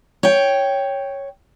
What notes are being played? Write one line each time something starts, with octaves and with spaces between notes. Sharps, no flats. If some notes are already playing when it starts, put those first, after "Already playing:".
C#5 G5